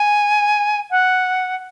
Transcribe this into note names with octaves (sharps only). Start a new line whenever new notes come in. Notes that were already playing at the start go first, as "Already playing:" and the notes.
Already playing: G#5
F#5